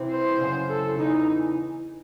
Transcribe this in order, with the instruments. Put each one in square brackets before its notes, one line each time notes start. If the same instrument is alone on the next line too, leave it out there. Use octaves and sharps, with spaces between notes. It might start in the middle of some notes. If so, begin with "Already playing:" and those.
Already playing: [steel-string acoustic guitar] C3 E3 C4 E4
[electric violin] C5
[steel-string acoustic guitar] F#2 C#3 E3
[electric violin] A4
[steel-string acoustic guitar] E2 C#3 E3 [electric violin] D#4